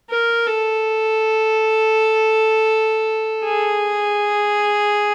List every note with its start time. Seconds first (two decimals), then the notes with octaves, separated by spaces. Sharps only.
0.10 A#4
0.47 A4
3.44 G#4